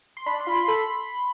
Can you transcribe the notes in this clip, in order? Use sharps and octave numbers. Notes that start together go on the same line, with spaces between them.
C6
D4 B5
C6
F4 B5
C6
A4 B5